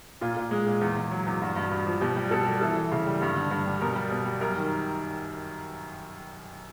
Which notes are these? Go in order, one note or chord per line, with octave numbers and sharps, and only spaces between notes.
A#2 F4
A#2
G#3
A#2
E2
E2
F#3
E2
G2 F#4
G2
G2
F3
B2 G4
G3
B2 A4
G3
E3 A4
E3
C#3
G3
G2
D3
G2
G3
B2 A#4
G3
B2
G3
F#2 A#4
D#3